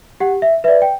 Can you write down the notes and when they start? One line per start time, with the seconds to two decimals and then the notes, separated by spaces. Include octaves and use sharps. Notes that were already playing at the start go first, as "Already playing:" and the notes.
0.20 G4 F#5
0.42 E5
0.64 B4 E5
0.68 D5
0.82 G5